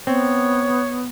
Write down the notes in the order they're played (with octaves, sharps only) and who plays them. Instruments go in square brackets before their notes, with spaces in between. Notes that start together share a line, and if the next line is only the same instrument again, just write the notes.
[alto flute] B3 [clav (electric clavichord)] C4 [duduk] C#5